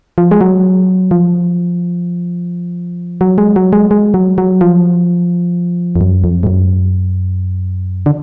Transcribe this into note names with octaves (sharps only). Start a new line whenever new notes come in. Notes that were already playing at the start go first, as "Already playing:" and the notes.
F3
G#3
F#3
F3
F#3
G#3
F#3
G#3
G#3
F#3
F#3
F3
F2
F#2
F2
G#2
F#2
D3